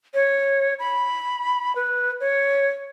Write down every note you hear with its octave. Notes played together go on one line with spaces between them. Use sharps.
C#5
B5
B4
C#5